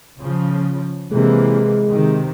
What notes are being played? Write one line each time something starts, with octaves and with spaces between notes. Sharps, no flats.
C#3 F3
C3 E3 G#3 A#3
C3 D#3